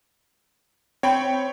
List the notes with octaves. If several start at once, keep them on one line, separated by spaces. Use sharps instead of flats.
C4 C#5 G5 B5